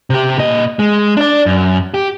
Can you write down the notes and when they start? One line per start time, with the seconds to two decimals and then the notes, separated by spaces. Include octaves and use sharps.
0.10 C3 G4
0.38 A#2 D#5
0.79 G#3
1.17 D4 D5
1.46 F#2
1.94 G4